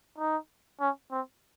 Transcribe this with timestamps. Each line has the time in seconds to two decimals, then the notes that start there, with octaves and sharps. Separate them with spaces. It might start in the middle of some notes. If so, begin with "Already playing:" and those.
0.18 D#4
0.80 C#4
1.12 C4